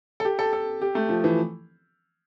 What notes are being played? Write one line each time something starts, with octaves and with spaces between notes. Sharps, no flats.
A4
G4
A4
A4
G4
A3
F3
E3